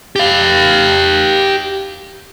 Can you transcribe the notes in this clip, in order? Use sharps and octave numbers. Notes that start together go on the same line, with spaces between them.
G4 F5